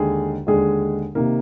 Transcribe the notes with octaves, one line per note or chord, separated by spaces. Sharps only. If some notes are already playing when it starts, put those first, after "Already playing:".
Already playing: D#2 D3 G#3 G#4
D#2 D3 G#3 G#4
C3 D#3 A#3